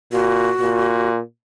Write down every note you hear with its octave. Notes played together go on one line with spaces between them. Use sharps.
A#2 F#4
A#2